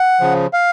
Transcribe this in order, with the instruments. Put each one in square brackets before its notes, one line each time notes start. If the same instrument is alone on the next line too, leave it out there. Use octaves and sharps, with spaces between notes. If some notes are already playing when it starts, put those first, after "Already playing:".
Already playing: [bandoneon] F#5
C#3 F3
F5